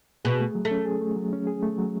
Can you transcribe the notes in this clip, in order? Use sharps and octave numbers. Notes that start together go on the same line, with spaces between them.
B2 G#4
A3
F#3
A3
C#4
G#4
A3
F#3
C#4
G#4
A3
F#3